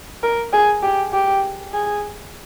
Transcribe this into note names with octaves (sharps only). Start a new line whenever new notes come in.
A#4
G#4
G4
G4
G#4